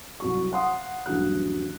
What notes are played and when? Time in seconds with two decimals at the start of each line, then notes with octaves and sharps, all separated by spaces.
0.20 C2 F#3 C#6
0.52 F5 F#5 C6 D#6
1.06 D#1 G2 E3 F#3 F#6